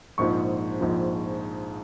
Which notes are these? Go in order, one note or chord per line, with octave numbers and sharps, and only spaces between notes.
A#1 G#2 F3 C#6
A#1 G#2 F3